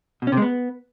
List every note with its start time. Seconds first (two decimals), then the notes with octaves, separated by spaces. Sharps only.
0.22 B2
0.27 C#4
0.32 C3
0.37 G#3
0.42 B3